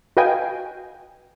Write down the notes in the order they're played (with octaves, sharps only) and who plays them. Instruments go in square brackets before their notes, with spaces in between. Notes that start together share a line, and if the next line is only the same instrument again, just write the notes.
[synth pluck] F#4 B4 D#5 F5 G5 G#5